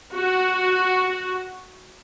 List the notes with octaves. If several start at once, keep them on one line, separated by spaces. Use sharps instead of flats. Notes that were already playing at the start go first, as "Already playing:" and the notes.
F#4